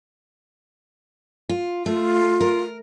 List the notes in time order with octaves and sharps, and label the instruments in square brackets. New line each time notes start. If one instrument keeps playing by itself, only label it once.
[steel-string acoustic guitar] F4
[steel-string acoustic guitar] A3 [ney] F4
[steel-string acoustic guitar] A#4